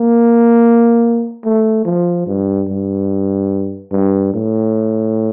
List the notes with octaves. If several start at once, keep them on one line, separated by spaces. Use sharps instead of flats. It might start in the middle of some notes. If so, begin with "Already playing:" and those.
Already playing: A#3
A3
F3
G2
G2
G2
A2